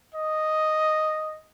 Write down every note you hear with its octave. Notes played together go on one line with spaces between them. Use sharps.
D#5